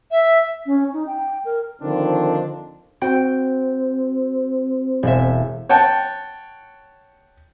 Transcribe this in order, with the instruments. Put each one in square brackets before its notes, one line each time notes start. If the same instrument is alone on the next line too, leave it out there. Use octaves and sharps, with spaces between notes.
[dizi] E5
[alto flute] C#4
D#4
G5
A#4
[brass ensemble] D3 D#3 F3 C4 D4
[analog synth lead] C4 [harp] F#4 G5
[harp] E1 E5
[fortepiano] C#5 F#5 G5 A5